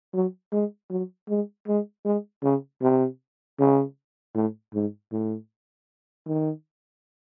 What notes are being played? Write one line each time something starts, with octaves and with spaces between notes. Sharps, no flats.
F#3
G#3
F#3
G#3
G#3
G#3
C#3
C3
C#3
A2
G#2
A2
D#3